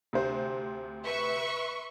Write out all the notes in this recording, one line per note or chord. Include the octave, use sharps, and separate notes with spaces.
D2 C3 C5
B4 E5 C#6